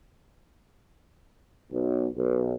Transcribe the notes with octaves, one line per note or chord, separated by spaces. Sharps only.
B1
B1